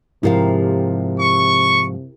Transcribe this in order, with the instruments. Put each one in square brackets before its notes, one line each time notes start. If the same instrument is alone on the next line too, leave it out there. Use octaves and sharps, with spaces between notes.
[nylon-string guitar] G#2 F3 F5 [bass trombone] C3 [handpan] E4 G4 A#4
[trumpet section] C#6